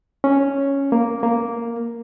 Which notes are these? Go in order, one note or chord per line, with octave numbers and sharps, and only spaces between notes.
C#4
A#3
A#3